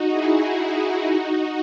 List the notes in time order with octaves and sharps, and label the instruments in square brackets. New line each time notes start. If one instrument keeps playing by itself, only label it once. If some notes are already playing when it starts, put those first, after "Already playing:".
Already playing: [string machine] D#4 F#4
E4 G#4
E4 G#4
D#4 F#4